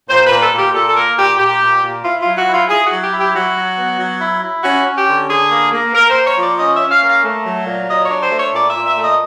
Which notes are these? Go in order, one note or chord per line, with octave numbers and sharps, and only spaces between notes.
A#2 C5
A#2 B4
A4
A#2 G4
A#2 A4
A4
A#3 A#4
A#2 G4
A#2 G4
A#2
A#2
E4 F4
F#3 F4
F#4
E4
F4
E4 G#4
F#4
F#3
G4
E4
G4
F#3 F#4
F#3
B3
F#3
E4
E4
C#4 F#4
C#4
G4
D3
D3 G#4
A#3
A#3
A#3 A#4
C5
A#3
C#5
F3 D5
C#4 D#5
C#4 E5
F5
A#3 F5
A3
F#3
A#2
F#3 D#5
C#5
D4
C5
A3
C#5
A#2 D5
E5
A#2
E5
A3
D#5